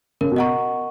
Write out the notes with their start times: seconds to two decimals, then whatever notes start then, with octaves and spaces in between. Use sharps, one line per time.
0.21 C#3 A#4
0.32 B2
0.36 D#5 F#5 A#5 C#6